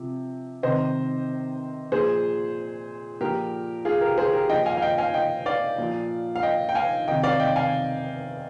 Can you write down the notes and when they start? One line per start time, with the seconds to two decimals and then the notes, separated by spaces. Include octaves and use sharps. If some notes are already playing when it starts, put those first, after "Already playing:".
Already playing: C3 F3
0.63 C3 D#3 C5 D#5
1.92 A#2 F3 G#4 C5
3.21 A#2 F3 G4 A#4
3.85 F4 G#4
4.01 G4 A#4
4.18 G#4 C5
4.33 G4 A#4
4.49 A#2 F3 D#5 G5
4.66 F5 G#5
4.77 F5
4.82 D#5 G5
4.98 F5 G#5
5.14 D#5 G5
5.46 D5 F5
5.78 A#2 F3
6.36 F5
6.43 D#5 G5
6.69 G5
6.75 F5 G#5
7.07 C3 D#3 D#5 G5
7.24 D5 F5
7.40 D#5 G5
7.56 F5 G#5